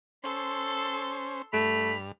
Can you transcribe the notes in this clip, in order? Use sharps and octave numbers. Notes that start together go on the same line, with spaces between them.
C#4 A4 C5 C6
G2 A3 B5 F7